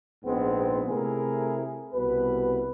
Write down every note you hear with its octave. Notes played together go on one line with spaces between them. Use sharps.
A#1 G#2 G#3 B3 C4
C3 A3 E4 G#4 A#4
C2 B2 B4